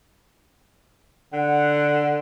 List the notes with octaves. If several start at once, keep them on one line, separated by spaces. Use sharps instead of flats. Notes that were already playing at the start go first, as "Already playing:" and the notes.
D3 F#5